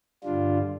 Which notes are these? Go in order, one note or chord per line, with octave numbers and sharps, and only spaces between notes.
G2 D3 G3 D4 F4